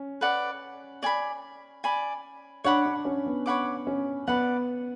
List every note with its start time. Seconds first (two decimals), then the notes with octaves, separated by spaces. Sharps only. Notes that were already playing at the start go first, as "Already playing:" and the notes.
Already playing: C#4
0.21 B4 D5 F#5
1.03 D5 G#5 B5
1.84 D5 G#5 B5
2.64 D4 C#5 F#5 B5 D6
2.86 D4
3.05 C#4
3.26 B3
3.46 C#5 F#5 B5 D6
3.87 C#4
4.27 B3 D5 F#5 B5